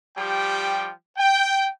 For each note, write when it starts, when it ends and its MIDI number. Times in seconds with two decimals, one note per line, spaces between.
0.16 0.90 53
0.16 0.90 55
0.16 0.90 67
0.16 0.90 79
1.17 1.69 79